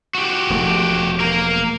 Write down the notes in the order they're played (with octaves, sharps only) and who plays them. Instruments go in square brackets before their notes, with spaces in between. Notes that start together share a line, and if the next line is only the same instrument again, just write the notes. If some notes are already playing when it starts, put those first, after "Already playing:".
[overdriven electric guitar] F#4 G4
[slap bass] E1 F3 A3
[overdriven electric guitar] A#3 A#4